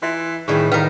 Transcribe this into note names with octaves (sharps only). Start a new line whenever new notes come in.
E3 E4 E5 C6
A2 D#3 E3 G3 G#4 D5 C#6
A2 D#3 A#4 B4 F5 G5